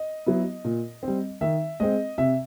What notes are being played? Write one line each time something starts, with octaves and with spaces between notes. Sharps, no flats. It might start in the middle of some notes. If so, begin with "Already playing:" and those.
Already playing: D#5
F#3 B3 E4
A#2
G3 C4
D#3 E5
G#3 C4 D#5
C3 E5